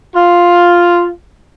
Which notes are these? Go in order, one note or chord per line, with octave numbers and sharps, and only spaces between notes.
F4